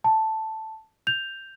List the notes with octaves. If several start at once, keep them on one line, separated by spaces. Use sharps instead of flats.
A5
G6 F7